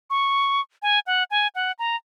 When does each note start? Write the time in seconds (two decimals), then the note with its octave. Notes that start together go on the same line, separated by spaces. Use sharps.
0.10 C#6
0.82 G#5
1.07 F#5
1.31 G#5
1.55 F#5
1.79 A#5